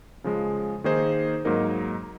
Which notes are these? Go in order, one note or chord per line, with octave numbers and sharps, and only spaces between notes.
C#3 F3 G#3
D#3 A#3 D#4 G#4 C5
G#2 F#3 A#3 D#4 A#4